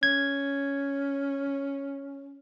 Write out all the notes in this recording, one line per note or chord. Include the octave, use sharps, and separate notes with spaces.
C#4 G#6